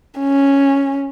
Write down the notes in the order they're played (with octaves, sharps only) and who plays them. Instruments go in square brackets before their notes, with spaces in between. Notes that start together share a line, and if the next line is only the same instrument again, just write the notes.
[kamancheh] C#4